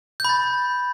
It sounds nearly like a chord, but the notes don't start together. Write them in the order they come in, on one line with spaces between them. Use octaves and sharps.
G6 B5 A6